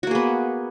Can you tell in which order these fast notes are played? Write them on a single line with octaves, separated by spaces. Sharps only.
F#4 A#3 G#4 B3